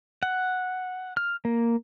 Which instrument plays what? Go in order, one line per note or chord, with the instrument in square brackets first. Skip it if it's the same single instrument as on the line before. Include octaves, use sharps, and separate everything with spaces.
[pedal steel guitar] F#5
F6
A#3